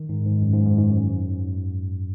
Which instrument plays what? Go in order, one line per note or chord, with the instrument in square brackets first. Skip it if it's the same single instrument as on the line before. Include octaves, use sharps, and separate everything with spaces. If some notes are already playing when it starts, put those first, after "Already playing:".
Already playing: [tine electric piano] D#3
G#2
G#2
F#2
G#2
G#2
G#2
F#2